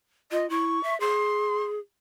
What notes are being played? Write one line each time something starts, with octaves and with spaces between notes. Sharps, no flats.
F4 D#5
E4 C#6
E5
G#4 C6